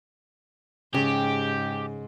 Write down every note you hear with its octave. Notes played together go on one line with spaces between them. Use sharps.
G#2 C#3 G4